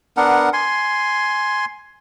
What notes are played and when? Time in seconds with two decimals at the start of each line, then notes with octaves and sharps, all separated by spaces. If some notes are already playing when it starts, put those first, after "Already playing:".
0.17 B3 D4 A#4 F#5
0.53 G#5 C6